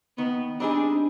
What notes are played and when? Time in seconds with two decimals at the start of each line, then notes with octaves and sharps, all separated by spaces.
0.17 D#3 B3
0.59 G3 C4 D4 D#4 G#4